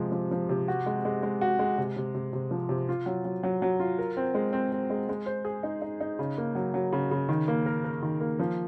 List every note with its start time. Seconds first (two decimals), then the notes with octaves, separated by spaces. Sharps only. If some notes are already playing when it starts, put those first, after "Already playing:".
Already playing: C3 F3 G#3
0.12 F3
0.31 F3
0.49 C3
0.68 F#4
0.86 G#3
1.05 G#3
1.23 G#3
1.41 F#4
1.59 G#3
1.78 C3
1.96 C3
2.15 C3
2.33 C3
2.51 F3
2.69 C3
2.89 F4
3.06 F#3
3.25 F#3
3.43 F#3
3.62 F#3
3.80 F4
3.99 A#4
4.17 C4
4.35 G#3
4.53 C4
4.72 C4
4.90 G#3
5.09 G#3
5.26 C5
5.45 G#4
5.63 D#4
5.82 D#4
6.01 D#4
6.19 C#3
6.38 A#3
6.55 F#3
6.74 F#3
6.92 C#3
7.11 C#3
7.29 D#3
7.48 A#3
7.66 A#4
7.85 A#4
8.02 D#3
8.21 A#3
8.39 F3